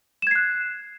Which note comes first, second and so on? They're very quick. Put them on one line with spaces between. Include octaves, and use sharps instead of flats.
E7 G#6 C7 F#6